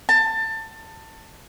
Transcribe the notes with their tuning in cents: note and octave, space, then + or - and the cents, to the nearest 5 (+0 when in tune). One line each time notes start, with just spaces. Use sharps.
A5 +20